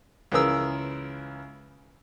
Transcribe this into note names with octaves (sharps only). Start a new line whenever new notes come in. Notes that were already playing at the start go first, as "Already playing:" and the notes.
C#2 E3 G#4 A#4 E6